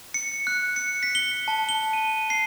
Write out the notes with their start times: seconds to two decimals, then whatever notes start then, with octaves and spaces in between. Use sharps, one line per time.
0.14 C#7
0.47 F#6
0.76 C#7
1.03 B6
1.15 G7
1.48 A5
1.69 G7
1.93 D#7
2.30 C7